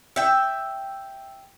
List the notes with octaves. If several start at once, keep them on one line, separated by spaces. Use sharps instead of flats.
E5 G5